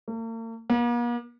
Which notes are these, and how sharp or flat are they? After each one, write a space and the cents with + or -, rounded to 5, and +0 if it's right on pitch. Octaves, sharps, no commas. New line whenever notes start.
A#3 -45
A#3 +45